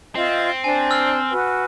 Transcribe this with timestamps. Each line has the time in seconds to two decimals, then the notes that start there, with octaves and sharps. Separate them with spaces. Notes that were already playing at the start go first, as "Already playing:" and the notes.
0.15 C4 F4 D#5 E5
0.64 D4 C5 G#5
0.91 E6 F6
1.30 F#4 B4 F#5